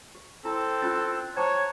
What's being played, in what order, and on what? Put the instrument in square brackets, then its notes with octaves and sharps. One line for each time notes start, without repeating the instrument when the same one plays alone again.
[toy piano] G4
[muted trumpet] C4 [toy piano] E4 [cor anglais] A4
[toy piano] C#4 F4 C6 [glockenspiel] F#6 A6
[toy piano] C5 G5 D6 [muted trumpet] C#5 [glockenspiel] A5 A#5 G#6